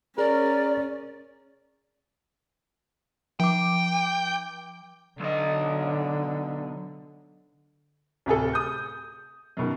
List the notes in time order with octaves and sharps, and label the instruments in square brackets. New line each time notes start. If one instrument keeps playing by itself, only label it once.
[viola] C#4 [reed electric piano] G#4 [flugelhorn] A#4 [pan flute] D5
[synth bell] F3 D6 [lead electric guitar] G5
[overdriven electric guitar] B1 D#5 [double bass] D3
[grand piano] D1 C3 G#4 A4
D#6 G6
F#2 B2 D#3